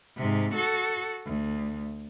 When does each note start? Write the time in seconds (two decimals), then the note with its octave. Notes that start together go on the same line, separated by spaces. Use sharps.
0.17 G#2 C3
0.54 F#4 A4
1.26 D2